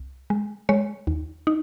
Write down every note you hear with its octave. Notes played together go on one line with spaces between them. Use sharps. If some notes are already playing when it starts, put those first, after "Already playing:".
Already playing: C2
G#3
G#3 C#5
D#2
D#4